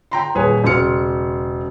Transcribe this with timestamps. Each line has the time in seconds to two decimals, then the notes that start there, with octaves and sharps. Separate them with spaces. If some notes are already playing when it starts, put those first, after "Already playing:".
0.11 G5 A#5 C6
0.35 D#1 G#4 B4 C#5
0.64 E1 C#3 C6 F6 C#7